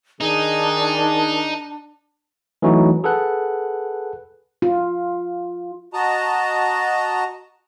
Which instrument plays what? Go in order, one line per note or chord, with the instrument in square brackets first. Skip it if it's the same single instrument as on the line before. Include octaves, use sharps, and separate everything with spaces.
[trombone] D#3 [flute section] D4 [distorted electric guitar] D#4 [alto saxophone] G#4
[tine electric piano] E3 F#3 A3 C#4 D#4 F#4
G#4 A4 B4 F#5 F#6
[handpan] F4
[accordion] F#4 D#5 A5 A#5